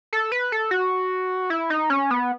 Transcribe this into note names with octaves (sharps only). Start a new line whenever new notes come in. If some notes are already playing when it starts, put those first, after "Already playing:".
A4
B4
A4
F#4
E4
D#4
C#4
B3